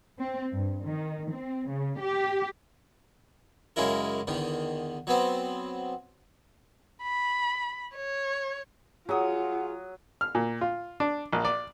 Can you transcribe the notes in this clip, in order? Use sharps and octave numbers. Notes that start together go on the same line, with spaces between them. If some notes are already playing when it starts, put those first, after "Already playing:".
C4
G2
D#3
C4
C#3
G4
F#2 C#3 G#3 C#4 E4 A#4
E2 D3 D#3
F#3 B3 C4
B5
C#5
F#3 F4 G#4 F#5 D#6
F6
A#2
F4
D4
A#1
D5